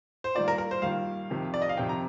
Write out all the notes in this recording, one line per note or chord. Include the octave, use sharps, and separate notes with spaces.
C5
G2 D#3 A#3 F4 D5
A#4
A#4
C5
G2 D#3 A#3 F4 F5
F2 C3 D#3
D5
D#5
F5
F2 C3 D#3 G5
A#5